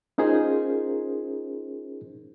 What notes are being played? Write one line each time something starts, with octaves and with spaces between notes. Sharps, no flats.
C#4 D#4 F4 G#4 A#4 C5